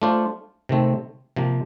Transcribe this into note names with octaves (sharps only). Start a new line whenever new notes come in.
A3 D4 F4 C5
C3 D#3 A3 C4
C3 F3 A#3